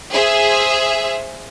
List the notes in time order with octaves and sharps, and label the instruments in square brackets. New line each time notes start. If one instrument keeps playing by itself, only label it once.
[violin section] G#4 C5 E5